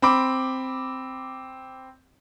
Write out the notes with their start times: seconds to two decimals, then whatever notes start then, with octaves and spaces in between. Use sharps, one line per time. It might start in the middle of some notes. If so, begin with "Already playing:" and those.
0.02 C4 B5 D6